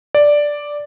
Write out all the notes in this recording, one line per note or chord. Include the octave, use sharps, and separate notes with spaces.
D5